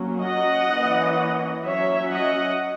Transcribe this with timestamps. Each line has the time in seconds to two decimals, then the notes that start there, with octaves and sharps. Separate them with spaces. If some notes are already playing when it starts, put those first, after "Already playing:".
Already playing: F#3 A#3 C#4
0.22 D#5 F#5
0.69 E3 A#3 C#4
1.64 F#3 C#4 C#5 E5
2.12 D#5 F#5